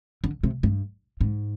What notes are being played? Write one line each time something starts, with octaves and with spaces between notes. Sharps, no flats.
D3
C3
G2
G#2